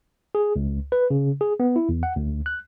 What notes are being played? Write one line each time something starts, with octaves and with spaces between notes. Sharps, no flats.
G#4
C#2
B4
C#3
G#4
B3
E4
E2
F#5
D2
F#6